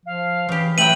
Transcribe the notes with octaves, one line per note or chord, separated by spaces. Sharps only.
F3 F5
C#3 E3 G4
E3 F#3 A3 G5 D#7 F#7